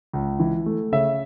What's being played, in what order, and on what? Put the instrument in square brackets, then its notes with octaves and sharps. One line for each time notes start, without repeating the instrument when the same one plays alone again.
[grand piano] C#2
E3
A3
C#3 E5